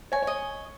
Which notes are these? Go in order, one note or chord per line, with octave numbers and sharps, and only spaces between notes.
C#5 G#5
C#5
D#5